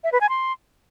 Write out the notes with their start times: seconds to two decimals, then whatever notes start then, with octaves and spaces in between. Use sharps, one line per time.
0.04 E5
0.12 B4
0.21 G#5
0.29 C6